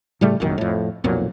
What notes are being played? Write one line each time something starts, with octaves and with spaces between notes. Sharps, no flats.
A2 C#3 G3 A3
F1 A#1 F#2 D#3
F2 A2
B1 F2 A#2 F#3